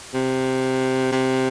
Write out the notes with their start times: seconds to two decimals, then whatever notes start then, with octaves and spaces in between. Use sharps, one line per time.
0.14 C3
1.12 C3